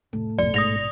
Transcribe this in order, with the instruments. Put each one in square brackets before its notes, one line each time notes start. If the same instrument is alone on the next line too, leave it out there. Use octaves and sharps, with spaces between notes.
[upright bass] F1 [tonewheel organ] A2 A3
[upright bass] A1 B2 [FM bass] F2 [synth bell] D5
[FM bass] G#2 [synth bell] D#6 A#6 F7